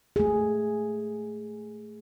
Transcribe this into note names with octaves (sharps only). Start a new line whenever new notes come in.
A3 G#4